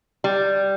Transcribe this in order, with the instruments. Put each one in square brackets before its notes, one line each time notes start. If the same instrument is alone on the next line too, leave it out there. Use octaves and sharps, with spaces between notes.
[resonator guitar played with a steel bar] G3